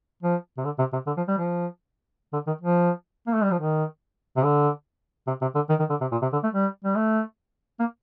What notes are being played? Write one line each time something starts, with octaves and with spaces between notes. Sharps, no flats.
F3
C3
D3
C3
C3
D3
F3
G3
F3
D3
D#3
F3
A#3
A3
G3
F3
D#3
C3
D3
C3
C3
D3
D#3
D#3
D3
C3
A#2
C3
D3
A3
G3
G3
A3
A#3